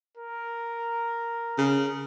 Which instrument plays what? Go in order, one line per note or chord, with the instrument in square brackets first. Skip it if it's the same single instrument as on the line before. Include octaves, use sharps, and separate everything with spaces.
[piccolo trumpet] A#4
[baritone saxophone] C#3